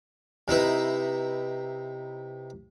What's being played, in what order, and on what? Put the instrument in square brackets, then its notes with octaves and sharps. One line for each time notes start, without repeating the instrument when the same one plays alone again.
[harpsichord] C3 D#4 E4 B4